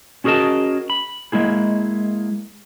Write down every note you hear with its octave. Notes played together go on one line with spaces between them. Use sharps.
C#4 F#4 G#4 A#4 D#5 A5
B5
G#3 A#3 E4 G#4